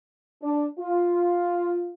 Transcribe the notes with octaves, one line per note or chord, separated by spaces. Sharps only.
D4
F4